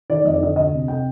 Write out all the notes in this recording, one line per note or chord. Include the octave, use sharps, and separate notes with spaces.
D#3 D5
F2 D#5
D5
D3 D#5
D2 D#5
C3
C3 G5